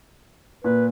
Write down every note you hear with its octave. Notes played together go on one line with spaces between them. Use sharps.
A#2 B4